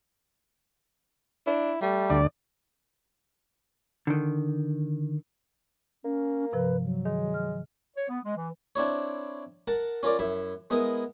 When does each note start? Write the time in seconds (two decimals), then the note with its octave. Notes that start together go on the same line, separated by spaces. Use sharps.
1.47 D4 E4
1.82 G3 A3
2.10 D2 D5
4.07 D3 D#3
6.05 A#3 C#4
6.53 G2 C3 F3 B4
6.84 F#3
7.06 D#3 G#3
7.34 F6
7.96 C#5
8.08 B3
8.23 G#3
8.36 E3
8.76 C4 D4 E4 C#5
9.67 A#4 F#5 A5
10.03 C#4 F4 A#4 D5
10.19 F#2 E4 E5
10.70 G#3 B3 E4 A#4 D#5